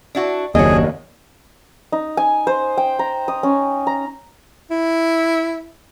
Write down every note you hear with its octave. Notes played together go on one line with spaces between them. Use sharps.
D4 E4 F#4
F#1 D#2 D4 F#4 G#4 C#5 D#5
D#4
G#5
C5
G5
A#5
D#6
C#4
A#5
E4